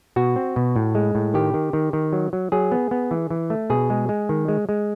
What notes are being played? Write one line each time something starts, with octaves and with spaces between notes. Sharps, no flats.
B2 F#4
C4
B2
A2
G#3
A2
D#3 G4
D#3
D#3
D#3
F#3
F#3
F#3 G#4
B3
B3
E3
E3
A3
B2 G#4
G#3
G#3
D#3
G#3
G#3